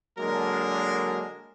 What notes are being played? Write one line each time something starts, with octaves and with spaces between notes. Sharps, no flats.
D3 F#3 G#3 A#3 D4 A#4